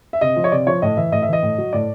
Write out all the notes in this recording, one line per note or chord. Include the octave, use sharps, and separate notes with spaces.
E5
C3 D#5
F3
C#5
C3 D5
F3 C#5
A2 D#5
E3 E5
A2 D#5
E5
E3 D#5
A2
F#3
A2 D5